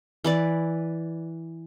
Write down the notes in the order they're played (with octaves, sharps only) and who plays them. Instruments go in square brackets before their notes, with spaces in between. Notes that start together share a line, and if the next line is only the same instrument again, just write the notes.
[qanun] E3 B4 D5